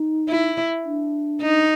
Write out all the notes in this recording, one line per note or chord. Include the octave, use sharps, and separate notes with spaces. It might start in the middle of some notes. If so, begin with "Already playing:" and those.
Already playing: D#4
E4
D4
D#4